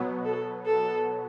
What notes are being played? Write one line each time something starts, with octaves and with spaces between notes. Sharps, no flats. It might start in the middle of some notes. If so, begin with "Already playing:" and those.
Already playing: B2 F#3 B3
A4
A4